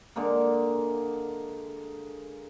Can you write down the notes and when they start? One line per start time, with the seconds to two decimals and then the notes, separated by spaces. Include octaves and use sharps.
0.16 D3 G#3 A#3